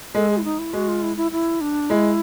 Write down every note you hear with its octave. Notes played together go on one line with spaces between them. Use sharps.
G#3 A4
G#4
E4
D#4
E4
G#3 F#4
F4
E4
E4
E4
D4
G#3 E4